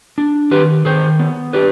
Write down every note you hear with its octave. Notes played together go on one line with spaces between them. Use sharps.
D4
D#3 G4 B4
D#3 G#4 C5
B3
D4 G4 B4